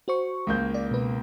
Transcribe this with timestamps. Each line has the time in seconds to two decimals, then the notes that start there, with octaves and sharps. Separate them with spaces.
0.08 F#4 C5 C#6
0.47 C#2 A#3 G6
0.74 D5
0.91 B2 B4